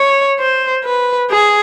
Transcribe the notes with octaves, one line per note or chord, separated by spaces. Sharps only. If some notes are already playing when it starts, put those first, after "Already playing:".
Already playing: C#5
C5
B4
G#4